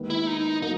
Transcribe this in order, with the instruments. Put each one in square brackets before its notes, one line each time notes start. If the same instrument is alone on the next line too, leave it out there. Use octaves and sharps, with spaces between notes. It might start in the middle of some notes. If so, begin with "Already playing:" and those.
Already playing: [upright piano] D#2 D#3 G#3 B3
[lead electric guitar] E4
D#4
[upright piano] F#3 A#3 [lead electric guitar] D#4